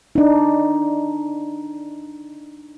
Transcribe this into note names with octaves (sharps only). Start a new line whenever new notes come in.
D4 D#4